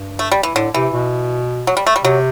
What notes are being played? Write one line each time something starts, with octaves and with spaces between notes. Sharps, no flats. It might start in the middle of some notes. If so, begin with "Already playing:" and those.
Already playing: G2
A3
G3
E3
A2 D3
C3 E3
B2
F#3
G3
A3
G3
C3 F#3